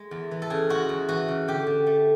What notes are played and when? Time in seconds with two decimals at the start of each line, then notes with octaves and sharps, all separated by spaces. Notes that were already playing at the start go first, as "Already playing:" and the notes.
Already playing: G#3
0.11 E2
0.31 E3
0.42 A4
0.50 C#3 G#4
0.69 G#3 F#4
0.89 E2
1.08 E3 F#4
1.28 C#3
1.48 D3 G4
1.67 D3
1.87 A3